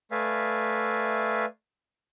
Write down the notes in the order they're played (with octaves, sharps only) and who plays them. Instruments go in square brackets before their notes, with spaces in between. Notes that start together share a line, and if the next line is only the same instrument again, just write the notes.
[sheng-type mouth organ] A3 B4 D5 E5 F5 G#5